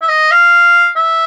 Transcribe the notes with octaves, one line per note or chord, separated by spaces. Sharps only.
E5
D#5
F5
E5